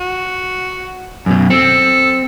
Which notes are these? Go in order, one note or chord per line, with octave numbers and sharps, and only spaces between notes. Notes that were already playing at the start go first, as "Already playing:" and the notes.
F#4
F#2 B2
C4 A4